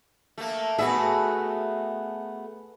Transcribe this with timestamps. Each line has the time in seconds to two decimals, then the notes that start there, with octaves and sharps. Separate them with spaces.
0.38 A3 A#3
0.78 A3 B3 F#4 G#4 E5